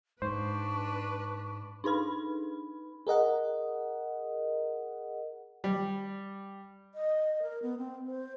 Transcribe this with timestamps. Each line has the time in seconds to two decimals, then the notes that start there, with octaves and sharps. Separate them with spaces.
0.22 G#2 D4 B4 C5 C#6
1.84 D4 D#4 B4 B5
3.07 G#4 A#4 D#5 F#5
5.64 G3
6.94 D#5
7.42 A#4
7.62 B3
7.78 C4
8.06 C5